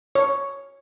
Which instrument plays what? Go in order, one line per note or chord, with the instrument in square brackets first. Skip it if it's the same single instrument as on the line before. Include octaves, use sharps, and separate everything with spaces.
[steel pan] C#5